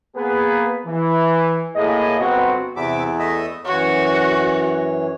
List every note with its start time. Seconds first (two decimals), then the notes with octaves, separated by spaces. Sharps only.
0.16 A#3 B3 G#4 B4
0.86 E3
1.75 A2 A#3 G#4 D#5
2.20 G1 B3 C4 F#4
2.76 E2 C3 E5 D6
3.19 A3 D#5 E5
3.65 F#2 E3 F#4 C#5